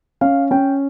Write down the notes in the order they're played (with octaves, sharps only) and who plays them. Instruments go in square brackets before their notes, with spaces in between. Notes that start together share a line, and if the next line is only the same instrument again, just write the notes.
[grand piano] C#4 F5
C#4 G5